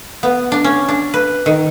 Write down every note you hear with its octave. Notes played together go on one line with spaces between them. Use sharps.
B3
D4
C#4
D4
B4
D#3